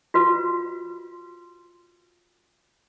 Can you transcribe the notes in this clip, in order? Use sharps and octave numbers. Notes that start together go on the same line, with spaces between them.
F4 F#4 B4